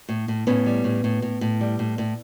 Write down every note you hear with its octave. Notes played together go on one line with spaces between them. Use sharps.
A2
A2
A2 B3 C#4
G3
A2
A2
A2
A2
G3
A2
A2